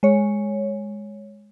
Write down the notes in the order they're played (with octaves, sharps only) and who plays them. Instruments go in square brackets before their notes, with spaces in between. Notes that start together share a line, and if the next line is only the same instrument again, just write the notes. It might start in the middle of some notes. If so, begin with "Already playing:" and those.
[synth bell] G#3 C#5